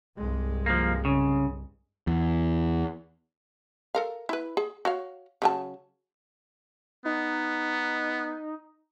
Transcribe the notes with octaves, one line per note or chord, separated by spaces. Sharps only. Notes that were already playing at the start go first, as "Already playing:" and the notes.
C2 G2 G#3
F3 A#3
C#3
E2
A4 A#4 F5
E4 B4
G#4
F#4 C#5 F5
C#3 F#3 A5
B3 D#4